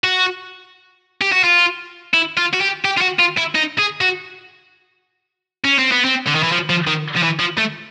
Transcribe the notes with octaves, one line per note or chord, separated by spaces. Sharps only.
F#4
G4
F#4
F4
E4
F4
F#4
G4
G4
F4
F#4
F4
E4
D#4
G#4
F#4
C#4
C4
B3
C4
D3
D#3
E3
F3
F3
D#3
F3
E3
F3
A3